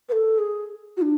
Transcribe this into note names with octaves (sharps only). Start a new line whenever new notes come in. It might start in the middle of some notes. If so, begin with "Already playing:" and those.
B4
A4
G#4
F#4
D4